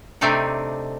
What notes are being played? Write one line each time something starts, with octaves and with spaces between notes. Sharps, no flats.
C3 A3 C4 D4 D#4 G5